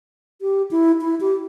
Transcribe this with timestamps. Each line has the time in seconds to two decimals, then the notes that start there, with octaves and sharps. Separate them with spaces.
0.41 G4
0.71 E4
1.01 E4
1.21 G4